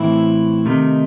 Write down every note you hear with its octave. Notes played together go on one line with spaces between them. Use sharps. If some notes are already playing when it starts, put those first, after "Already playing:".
Already playing: A2 E3 C4 E4
C3 D#3 A3 D#4